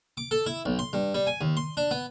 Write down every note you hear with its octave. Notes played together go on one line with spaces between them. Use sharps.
D6
A4
E4
B1
C6
G2
G3
G#5
D#2
C6
D4
B3